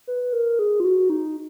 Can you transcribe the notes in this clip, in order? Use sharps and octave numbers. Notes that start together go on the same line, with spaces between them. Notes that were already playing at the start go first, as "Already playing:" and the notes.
B4
A#4
G#4
F4
F#4
D#4